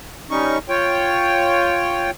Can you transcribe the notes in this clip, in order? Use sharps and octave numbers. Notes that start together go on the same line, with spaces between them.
G3 C#4 D#4 C#6
F4 C#5 G5